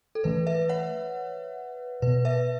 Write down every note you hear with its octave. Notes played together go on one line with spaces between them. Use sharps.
A4
E3 A3 C#4 B4
B4 E5
C#5 F#5
B2 B3 B4
B4 E5